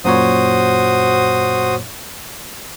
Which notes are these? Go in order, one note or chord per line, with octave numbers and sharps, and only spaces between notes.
F#2 A#2 F#4 C5 C#5 D#6